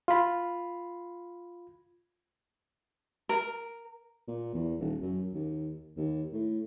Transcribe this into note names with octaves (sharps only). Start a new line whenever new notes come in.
F4 B5
A#4
A#2
E2
D#1
F#2
D#2
D#2
A2